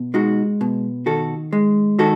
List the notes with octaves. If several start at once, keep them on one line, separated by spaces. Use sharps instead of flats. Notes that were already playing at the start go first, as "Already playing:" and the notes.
Already playing: B2
G#3 D#4 F#4
B2
D#3 F#4 A4
G#3
D#3 F#4 A4